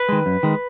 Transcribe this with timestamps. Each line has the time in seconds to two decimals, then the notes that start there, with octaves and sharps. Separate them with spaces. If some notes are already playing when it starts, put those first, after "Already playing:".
Already playing: B4
0.09 D#3 G#3
0.26 F#2
0.43 D#3 G#3